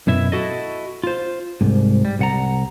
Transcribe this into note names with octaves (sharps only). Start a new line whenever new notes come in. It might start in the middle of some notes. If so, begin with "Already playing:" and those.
F#2 B2 E4 E5
E4 F#4 A4 D#5
F4 C5
C2 G#2
G3
C2 F#5 A#5